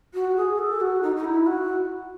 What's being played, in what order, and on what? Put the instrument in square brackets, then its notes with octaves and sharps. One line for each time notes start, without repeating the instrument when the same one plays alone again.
[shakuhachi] F#4
G#4
A4
F#4
D#4
D#4
E4
F#4